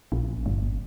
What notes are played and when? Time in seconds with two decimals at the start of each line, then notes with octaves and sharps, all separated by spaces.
0.12 A#1
0.46 G1